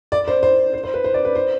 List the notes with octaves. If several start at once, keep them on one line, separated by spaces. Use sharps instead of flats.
D5
C5
C5
C5
C5
B4
C5
D5
B4
C5